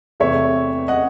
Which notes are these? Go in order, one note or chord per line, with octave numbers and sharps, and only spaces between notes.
E2 C3 E3 A3 C#5 E5
D#5 F#5